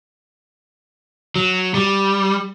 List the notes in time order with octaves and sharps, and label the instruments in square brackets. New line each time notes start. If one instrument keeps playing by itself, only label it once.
[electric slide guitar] F#3
G3